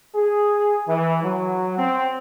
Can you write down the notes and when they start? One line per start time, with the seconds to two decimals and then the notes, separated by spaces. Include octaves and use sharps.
0.15 G#4
0.87 E3
1.23 F#3
1.78 C4